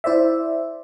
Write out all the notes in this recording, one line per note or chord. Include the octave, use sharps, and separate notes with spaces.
E4 C5 D5 E5